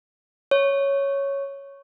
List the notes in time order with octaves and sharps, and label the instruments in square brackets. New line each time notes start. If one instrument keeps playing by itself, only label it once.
[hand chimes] C#5